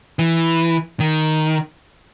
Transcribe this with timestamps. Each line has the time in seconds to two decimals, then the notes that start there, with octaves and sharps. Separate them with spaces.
0.19 E3
1.00 D#3